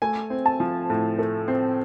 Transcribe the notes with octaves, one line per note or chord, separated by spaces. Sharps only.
A3 G#5
C4
A5
F3
A2
A3
C4